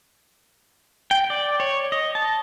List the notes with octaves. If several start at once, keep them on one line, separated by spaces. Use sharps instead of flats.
G5
D5
C#5
D#5
A5